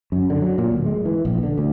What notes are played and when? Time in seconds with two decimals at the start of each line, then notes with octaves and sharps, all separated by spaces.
0.12 F#2
0.30 D3
0.42 F#3
0.58 A#2
0.72 D1
0.86 G#3
1.05 E3
1.25 A#1
1.43 D3
1.58 D2